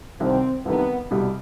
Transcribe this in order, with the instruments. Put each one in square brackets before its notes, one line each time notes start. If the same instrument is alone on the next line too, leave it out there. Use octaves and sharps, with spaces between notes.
[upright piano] C2 C3 D#3 [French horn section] C4
[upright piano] C2 C3 D#3 [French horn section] B3
[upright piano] C2 B2 G3